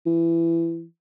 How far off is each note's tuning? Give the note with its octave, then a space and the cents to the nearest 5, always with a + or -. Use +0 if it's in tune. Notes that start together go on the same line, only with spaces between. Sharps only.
E3 +20